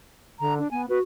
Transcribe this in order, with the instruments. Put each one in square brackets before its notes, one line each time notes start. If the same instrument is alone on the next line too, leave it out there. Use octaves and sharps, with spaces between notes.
[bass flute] D3 [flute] A#5
[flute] D4
[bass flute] B3 [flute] G#5
[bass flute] F#4 [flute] B4